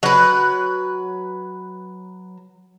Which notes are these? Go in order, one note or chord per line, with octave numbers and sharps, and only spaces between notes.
F#3 B4